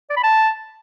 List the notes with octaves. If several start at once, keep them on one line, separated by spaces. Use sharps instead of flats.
D5
B5
A5